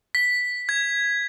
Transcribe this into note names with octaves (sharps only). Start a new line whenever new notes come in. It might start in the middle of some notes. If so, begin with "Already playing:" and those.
B6
G#6